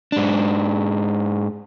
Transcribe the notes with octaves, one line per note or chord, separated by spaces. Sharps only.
G#2 D4